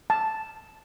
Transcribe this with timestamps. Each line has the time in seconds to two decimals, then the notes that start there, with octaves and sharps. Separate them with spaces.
0.10 A5